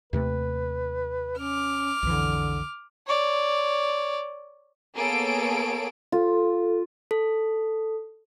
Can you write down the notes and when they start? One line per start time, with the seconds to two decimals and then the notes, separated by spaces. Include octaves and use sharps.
0.13 D#2 C3 A3 B4
1.38 C#4 D6 F6
2.03 B1 F2 D3 E3
3.07 C#5 D5
4.96 A#3 B3 G#4 A4 C#5 D7
6.12 F4 A4
7.11 A4